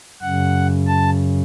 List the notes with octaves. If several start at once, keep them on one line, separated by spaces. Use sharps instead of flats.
F#2 C#3 F#5
A5